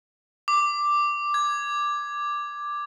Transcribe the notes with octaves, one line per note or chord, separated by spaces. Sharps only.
D6
G#6